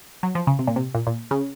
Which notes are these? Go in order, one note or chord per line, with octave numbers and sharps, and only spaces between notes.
F#3
F3
C#3
C3
A#2
C3
A#2
A#2
C#3